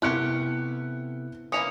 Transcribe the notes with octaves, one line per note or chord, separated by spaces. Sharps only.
C3 A3 B3 C4 E4 G4 F#6 C#7
E3 A#3 C#4 D#6 C#7 F7